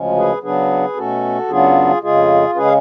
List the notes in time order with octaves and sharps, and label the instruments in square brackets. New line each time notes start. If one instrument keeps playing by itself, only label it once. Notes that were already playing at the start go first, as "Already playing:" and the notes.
Already playing: [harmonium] D2 C#3 F3 G#3 C#4
G#4 B4
C#3 F#3 B3 D4 G#4 B4
B2 A3 C#4 F#4 A4
F#2 C#3 F#3 B3 D4 F4 G#4
F2 C#3 G#3 F4 G#4
C#3 G#3 C#4 G#4 B4
F5